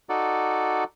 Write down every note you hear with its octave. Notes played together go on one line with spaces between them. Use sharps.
D#4 F#4 A4 D5